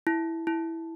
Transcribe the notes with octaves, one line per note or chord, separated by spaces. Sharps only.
E4
E4